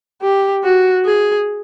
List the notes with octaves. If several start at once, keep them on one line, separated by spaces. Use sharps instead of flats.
G4
F#4
G#4